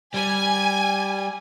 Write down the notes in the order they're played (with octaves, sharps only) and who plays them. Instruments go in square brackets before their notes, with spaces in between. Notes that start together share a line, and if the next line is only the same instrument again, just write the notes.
[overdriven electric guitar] G3 [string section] G#5